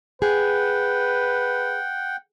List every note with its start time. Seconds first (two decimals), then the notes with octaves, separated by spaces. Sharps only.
0.22 G#4 B4 F#5 G5